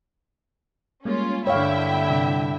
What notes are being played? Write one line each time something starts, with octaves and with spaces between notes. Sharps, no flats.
G3 G#3 A#3 C#4 F4
G2 D3 E4 C#5 E5 F5 G5
C3 G3